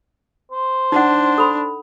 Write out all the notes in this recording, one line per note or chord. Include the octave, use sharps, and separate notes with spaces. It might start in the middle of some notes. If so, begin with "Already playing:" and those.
C5
D4 D#4 F#5
A4 B5